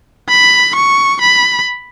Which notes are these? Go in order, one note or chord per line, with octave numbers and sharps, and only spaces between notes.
B5
C#6
B5